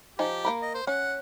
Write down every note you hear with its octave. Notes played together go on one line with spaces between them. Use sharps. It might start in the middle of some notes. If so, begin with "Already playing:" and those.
F3 D#4 G4 G#5
A#3 A#4 B5
D#5
C5
C#4 F#5